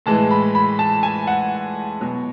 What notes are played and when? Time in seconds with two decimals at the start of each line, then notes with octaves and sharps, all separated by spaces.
0.06 A2 E3 G#3 A5
0.31 B5
0.55 B5
0.79 A5
1.03 G#5
1.27 F#5
2.01 B2 F#3